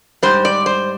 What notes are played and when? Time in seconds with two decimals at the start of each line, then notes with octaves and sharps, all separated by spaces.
0.23 G#2 G3 C5
0.45 D5
0.66 C5